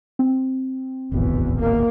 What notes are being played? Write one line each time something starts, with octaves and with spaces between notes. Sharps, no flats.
C4
D1 G#1 E2 B2
A#3